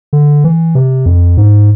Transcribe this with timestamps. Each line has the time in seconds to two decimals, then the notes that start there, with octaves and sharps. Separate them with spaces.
0.13 D3
0.44 E3
0.75 C3
1.06 F2
1.37 G#2